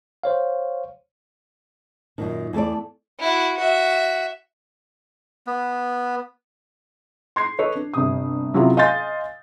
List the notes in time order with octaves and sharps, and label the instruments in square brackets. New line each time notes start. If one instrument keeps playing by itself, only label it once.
[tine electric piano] C5 C#5 F5
[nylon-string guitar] F#2 A#2 D#3
E2 A3 A4 D5
[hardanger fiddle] E4 F#4
F#4 E5
[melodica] B3
[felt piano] C6 G#6 C7
A4 B4 C#5 D#5
D4
G1 C3 D#6
C3 F#3 C#4 E4 F4 G#4
D#5 F5 G#5 C6 G6 A6